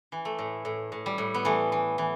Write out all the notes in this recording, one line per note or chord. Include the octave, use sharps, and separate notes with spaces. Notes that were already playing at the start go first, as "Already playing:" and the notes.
E3
A3
A2
A2
A2
G3
A2
B3
E3 A3
E3
E3